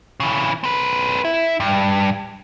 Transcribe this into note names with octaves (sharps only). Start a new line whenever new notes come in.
C#3 E3
C4 B4
E4
G2